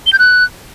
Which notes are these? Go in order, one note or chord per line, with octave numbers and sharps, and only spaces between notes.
G7
G6
F#6